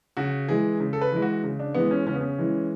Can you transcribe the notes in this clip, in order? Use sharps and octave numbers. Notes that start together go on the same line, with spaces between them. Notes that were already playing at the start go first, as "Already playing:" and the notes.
C#3 F#4
E3 G#3 G#4
C#3
A4
B4
E3 G#3
F#4
C#3
D4
E3 G#3 B3
C#4
C#3 C#4
B3
C#4
E3 G#3